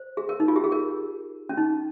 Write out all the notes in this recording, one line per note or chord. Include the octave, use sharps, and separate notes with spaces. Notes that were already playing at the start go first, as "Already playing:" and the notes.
Already playing: C5
G#4
A#4
D#4
F4
G4
G#4
A#4
C#4
D#4